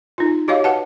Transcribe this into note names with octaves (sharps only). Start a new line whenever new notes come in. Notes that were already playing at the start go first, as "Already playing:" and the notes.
D#4 F4
F#4 G4 C#5 D#5 F5
B4 F#5 A5